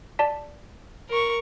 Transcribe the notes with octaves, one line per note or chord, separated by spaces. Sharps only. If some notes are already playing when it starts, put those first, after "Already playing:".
D5 A5 B6
A#4 C#6